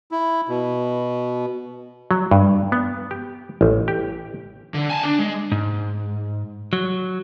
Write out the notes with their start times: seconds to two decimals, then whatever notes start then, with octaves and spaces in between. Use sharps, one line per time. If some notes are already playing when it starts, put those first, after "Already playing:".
0.11 E4
0.49 B2
2.11 F#3
2.31 G2
2.72 B3
3.11 G4
3.61 A1
3.88 G4
4.74 D3
4.90 G#5 A5
5.03 D4
5.19 G#3
5.52 G#2
6.73 F#3